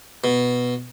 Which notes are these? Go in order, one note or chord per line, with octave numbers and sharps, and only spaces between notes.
B2